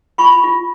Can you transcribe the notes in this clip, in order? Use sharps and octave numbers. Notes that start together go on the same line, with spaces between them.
F4 B5 C#6
F4